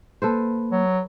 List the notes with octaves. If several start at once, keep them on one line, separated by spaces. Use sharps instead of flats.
A#3 A4 B4 C5
F#3